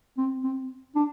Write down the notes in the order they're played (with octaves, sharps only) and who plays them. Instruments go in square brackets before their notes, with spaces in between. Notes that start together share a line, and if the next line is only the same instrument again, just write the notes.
[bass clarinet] C4
C4
D4